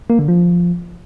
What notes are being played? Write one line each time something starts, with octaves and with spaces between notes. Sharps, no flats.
A#3
D3
F3